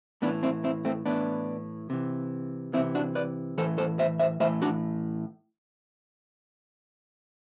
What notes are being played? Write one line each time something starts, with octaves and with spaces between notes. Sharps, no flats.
A2 E3 B3 D4
C4 E4
C4 E4
A3 C4
A2 E3 B3 D4
C3 E3
C3 E3 C4 E4
D4 F#4
B4 D5
A2 E3 A4 C5
A4 C5
C5 E5
C5 E5
A2 E3 C5 E5
D4 F#4